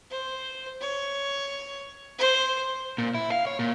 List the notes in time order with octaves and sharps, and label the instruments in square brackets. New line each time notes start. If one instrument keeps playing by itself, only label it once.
[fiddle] C5
C#5
C5
[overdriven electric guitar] A#2
E4
F5
C#5
A#2